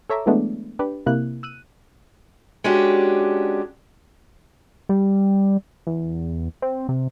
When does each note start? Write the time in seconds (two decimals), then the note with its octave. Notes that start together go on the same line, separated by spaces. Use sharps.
0.10 A4 C#5 E5 A#5 D6
0.26 E3 F#3 G#3 A3 B3 D4
0.79 D4 G4 B4
1.06 C3 A#3 E4 F#6
1.43 E6 F#6 D#7
2.64 G#3 C#4 D4 F#4 G4
4.89 G3
5.87 E2
6.62 C4
6.89 C3